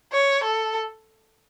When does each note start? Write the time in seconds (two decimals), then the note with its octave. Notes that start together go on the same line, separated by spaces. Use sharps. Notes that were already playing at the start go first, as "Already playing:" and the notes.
0.13 C#5
0.44 A4